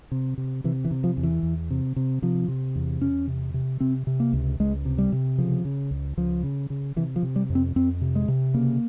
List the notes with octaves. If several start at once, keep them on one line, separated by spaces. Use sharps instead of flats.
C3
C3
C3 E3
E3
C3
F3
E2
E3
E2
C3
C3
C3 F3
C3
E2
E2 C#4
C3
C3
C3 C4
C3
A#3
C#2
C#2 G#3
C3
G3
C3
C#3 F3
C#3
C#2
C#2 F3
C#3
C#3
C3 E3
F3
C3
G3
F2
C4
F2 C4
C3
G#3
C3
C#3 A#3